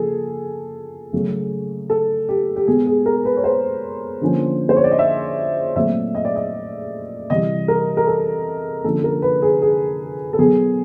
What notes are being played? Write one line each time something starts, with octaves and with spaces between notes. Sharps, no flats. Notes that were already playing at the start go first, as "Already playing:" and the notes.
Already playing: C#3 F3 A#3 G#4 A4
C#3 F#3 A3
A4
G4
G4
B2 G#3 B3 G#4
G#4
A#4
B4
C#5
C5
D3 F3 A#3 C#4
C5
C#5
D5
D#5
E5
A#2 F#3 A3 C4 E5
D#5
D5
D#5
C3 E3 G3 D#5
A#4
A#4
A4
D3 F3 A#3 C#4 A4
A#4
B4
G#4
G#4
A4
B2 F#3 B3 G#4